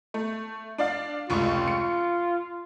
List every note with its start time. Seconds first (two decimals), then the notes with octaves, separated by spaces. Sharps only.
0.14 A3
0.78 D4 D5 F5
1.30 F1 C#2 F4 C#6
1.68 C#7